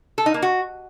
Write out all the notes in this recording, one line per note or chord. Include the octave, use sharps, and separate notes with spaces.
A4
D#4
A#3
F#4